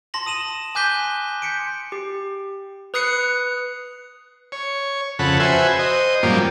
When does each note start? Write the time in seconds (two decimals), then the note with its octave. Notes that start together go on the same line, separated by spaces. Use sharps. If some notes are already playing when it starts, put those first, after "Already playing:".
0.14 A5 C6 A#6 F#7
0.26 D#6 D#7 E7 F#7
0.75 G#5 D6 F#6 G6 B6 G7
1.42 G6 B6 C#7 D7
1.92 G4
2.94 B4 D#6 F#6 C7 C#7
4.52 C#5
5.19 F2 C#3 A4 F#5 B5
5.40 F#4 B4 C5 E5 G#5
5.79 C5 D#5
6.23 F#2 A#2 F3 G3 A#3